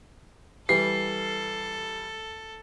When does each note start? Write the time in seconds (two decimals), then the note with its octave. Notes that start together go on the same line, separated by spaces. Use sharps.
0.69 E3 G3 A4 C7